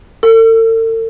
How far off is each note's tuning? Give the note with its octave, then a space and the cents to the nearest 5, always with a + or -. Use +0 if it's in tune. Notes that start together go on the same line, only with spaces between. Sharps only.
A4 +45